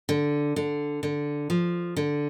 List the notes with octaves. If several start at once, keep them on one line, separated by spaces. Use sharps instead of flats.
D3
D3
D3
F3
D3